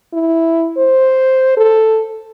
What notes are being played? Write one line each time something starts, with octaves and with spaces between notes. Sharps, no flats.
E4
C5
A4